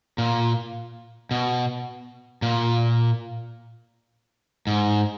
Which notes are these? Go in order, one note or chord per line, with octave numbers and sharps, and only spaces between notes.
A#2
B2
A#2
G#2